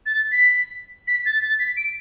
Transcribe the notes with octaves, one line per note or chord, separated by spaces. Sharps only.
A6
B6
B6
A6
A6
B6
D7